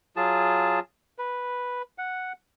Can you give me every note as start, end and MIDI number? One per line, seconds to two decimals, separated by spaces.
0.16 0.79 54
0.16 0.79 65
0.16 0.79 68
0.16 0.79 81
1.19 1.82 71
1.98 2.33 78